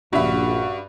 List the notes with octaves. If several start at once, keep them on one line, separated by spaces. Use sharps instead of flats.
A#1 G2 C#3 F#4 E5 B5